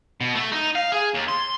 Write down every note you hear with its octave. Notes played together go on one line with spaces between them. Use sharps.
B2
A3
D#4
F5
G#4
D#2
C6